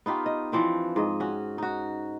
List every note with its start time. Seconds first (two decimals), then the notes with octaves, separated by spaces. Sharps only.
0.06 B3 D#4 F4 G4
0.26 D#5
0.52 E3 F3 C4 D4
0.96 G#2 D#5
1.20 C#4 F#4
1.58 D#4 F#4